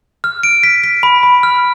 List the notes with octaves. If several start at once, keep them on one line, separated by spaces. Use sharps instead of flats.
F6
D7
B6
B6
B5
B5
F6